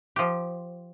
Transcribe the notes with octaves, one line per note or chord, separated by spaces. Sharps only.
F3 G4